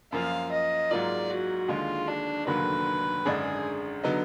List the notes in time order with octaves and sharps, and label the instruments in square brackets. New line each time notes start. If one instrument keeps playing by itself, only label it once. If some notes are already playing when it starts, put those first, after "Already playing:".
[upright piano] F#2 F3 A#3 F4 [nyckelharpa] F5
[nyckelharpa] D#5
[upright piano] G#2 F#3 A#3 F4 [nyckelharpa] D5
[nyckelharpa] F#4
[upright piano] D#2 D3 G#3 [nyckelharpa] F4
[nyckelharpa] D4
[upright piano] F1 D#2 D3 F#3 A#3 [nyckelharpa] B4
[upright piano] G#1 F#2 D3 G#3 D4 [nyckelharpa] G#4
[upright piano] D3 F#3 B3 D#4